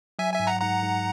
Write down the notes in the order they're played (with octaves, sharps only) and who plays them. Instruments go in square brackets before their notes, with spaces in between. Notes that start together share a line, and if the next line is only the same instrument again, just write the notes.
[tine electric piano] F#3 [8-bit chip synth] E5 G#5
[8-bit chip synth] E5 G#5
[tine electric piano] G#2
[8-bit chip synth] F#5 A#5
[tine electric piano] G#2 [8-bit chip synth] F#5 A#5
[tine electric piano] G#2